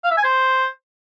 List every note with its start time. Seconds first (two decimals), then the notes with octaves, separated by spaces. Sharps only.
0.04 F5
0.10 E5
0.17 G#5
0.24 C5